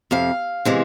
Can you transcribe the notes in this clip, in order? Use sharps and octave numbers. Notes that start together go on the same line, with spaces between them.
F2 C3 F5
C3 E3 G#3